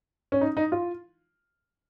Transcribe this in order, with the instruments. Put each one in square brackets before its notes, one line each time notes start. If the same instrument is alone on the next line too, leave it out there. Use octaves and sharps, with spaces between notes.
[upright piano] C#4
D#4
D#4
F4